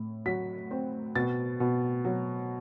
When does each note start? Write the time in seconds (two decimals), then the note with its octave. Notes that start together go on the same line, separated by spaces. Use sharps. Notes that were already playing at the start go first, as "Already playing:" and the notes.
Already playing: A2
0.26 F#3 B6
0.71 C4
1.15 B2 A6
1.60 B2
2.05 F#3